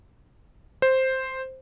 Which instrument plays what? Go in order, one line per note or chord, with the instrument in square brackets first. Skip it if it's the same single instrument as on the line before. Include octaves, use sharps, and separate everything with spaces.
[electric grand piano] C5